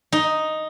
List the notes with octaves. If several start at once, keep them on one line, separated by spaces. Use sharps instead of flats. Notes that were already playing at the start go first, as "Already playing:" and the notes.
D#4